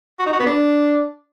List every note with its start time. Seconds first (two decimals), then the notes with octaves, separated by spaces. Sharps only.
0.19 F#4
0.26 D#4
0.33 F#4
0.40 B3
0.46 D4